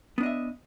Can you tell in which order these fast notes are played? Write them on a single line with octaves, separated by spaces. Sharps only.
B3 D4 D#5 E5